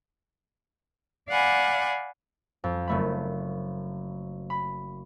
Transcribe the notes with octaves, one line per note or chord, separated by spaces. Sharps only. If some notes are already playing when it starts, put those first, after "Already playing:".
D5 F5 F#5 G#5 B5
F2
F#1 A3 B5
B5